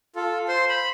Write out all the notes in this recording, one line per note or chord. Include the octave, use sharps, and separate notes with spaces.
F4 A4
C5 C6
B5